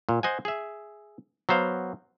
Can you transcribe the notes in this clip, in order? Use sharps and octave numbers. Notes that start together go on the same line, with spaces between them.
A#2
C5 D#5 F#5 G#5
G#4 E5
F#3 B3 C5 F5